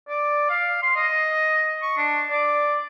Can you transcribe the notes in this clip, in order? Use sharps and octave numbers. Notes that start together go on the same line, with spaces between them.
D5
F5
C6
D#5
C#6
D4
D5